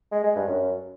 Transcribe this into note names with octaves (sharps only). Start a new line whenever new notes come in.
G#3
G#3
G2
F#2